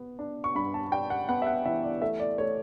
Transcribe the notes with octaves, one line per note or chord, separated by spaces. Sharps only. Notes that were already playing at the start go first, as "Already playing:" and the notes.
Already playing: B3
D4
C#6
G2 B5
A5
D4 G5
F#5
B3 F#5
E5
F#5
E3 E5
D5
A3 E5
D5
A3 C#5